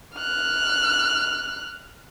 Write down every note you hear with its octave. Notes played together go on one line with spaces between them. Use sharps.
F6 F#6